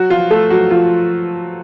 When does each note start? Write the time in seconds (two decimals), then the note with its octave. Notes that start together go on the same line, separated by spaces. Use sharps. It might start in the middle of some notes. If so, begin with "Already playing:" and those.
Already playing: F#3 F#4
0.10 F3 F4
0.31 A3 A4
0.50 F#3 F#4
0.71 F3 F4